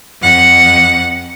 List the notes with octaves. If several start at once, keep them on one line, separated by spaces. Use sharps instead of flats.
F2 F#5